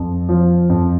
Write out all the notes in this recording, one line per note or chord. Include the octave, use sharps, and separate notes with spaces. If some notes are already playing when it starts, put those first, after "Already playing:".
Already playing: F2
F3
F2